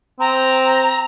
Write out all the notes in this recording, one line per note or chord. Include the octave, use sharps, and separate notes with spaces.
C4 A#5